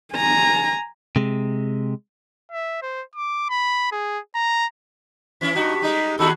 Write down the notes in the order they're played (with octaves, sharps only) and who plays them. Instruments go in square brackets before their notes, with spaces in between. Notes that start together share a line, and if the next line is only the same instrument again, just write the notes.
[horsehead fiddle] G#5 A#5
[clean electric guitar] C3 G#3
[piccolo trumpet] E5
C5
D6
B5
G#4
A#5
[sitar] E3 C#4 E4 [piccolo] B6
[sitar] G2 F#4 [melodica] D#4
[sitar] G3 G#3 [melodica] D#4
[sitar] D#2 F#4 G#4 [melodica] D#4 A4 [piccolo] B5